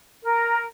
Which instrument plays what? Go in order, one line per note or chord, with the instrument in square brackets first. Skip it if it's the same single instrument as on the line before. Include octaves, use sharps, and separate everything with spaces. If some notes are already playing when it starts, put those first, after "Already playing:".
[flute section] A#4